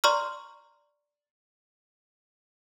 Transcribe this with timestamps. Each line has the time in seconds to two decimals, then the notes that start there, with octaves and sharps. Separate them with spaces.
0.04 D5 A#5 C6 C#6 F6